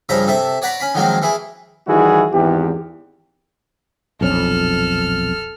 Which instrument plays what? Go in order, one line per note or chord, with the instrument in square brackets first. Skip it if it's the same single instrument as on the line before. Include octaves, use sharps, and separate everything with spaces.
[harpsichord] G2 C#3 F3 E5 A#5
C3 A4 E5
C#5 D5 F#5 A#5 B5
C#4 B5
D#3 F3 F#3 G#3 A#3 C4
E3 E4 G#4
[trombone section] D#3 E3 G3 E4 F#4 G#4
G#1 E2 E3 G4
[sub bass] D#1 [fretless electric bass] B1 F2 C#4 [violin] A4 F6